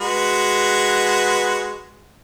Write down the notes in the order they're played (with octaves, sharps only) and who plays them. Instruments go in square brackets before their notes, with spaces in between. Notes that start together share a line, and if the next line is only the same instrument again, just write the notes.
[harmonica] G#3 F#4 B4